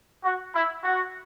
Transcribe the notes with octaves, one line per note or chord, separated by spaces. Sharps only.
F#4
E4
F#4